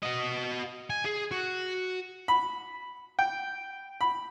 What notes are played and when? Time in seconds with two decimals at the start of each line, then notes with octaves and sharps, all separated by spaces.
0.02 F#4 D#5
0.90 G#5
1.05 G#4
1.31 F#4
2.28 B5
3.19 G5
4.01 B5